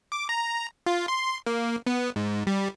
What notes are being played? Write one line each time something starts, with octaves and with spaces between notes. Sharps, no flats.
D6
A#5
F4
C6
A#3
B3
G#2
G3